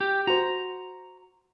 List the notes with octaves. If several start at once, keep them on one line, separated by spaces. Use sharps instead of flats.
G4
F#4 C5 A#5